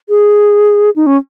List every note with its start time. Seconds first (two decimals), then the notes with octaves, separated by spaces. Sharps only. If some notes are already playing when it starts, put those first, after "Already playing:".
0.09 G#4
0.96 D#4
1.06 C#4